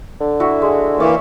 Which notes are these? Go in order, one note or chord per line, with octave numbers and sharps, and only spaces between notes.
D3
E4 F#4
G#3
E3 A#3 C#5 D5 E5